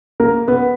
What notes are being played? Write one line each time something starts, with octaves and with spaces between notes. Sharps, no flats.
A#3 A#4
B3 B4